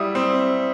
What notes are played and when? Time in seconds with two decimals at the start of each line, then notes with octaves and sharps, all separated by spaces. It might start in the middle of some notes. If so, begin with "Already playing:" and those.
Already playing: G3 E4 D#6
0.15 C4